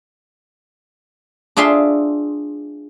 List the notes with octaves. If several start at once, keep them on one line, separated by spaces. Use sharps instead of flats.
D4 F4 G#4 E5 C6